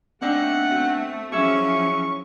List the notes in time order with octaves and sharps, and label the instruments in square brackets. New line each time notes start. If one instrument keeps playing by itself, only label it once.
[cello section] A3 [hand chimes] B3 D4 G5 [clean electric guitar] C4 D#4 D5 [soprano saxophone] F#5
[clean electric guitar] C4 F#4
[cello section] F3 F#3 C#4 [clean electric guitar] E4 E5 [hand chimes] G#4 [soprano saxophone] C#6